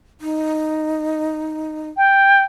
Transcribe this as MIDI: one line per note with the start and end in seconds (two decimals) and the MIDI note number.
0.21 1.89 63
1.97 2.44 79